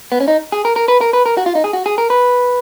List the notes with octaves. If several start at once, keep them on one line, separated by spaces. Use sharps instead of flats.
B3
C#4
D#4
G#4
A#4
A#4
B4
A#4
B4
A#4
F#4
F4
D#4
G#4
F#4
G#4
A#4
B4